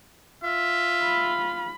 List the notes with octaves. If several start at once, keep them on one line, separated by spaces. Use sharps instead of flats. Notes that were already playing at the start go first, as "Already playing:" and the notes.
F4 E5
B5